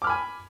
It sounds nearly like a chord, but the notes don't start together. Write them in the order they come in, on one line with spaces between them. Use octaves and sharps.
D6 F6 B5 G#5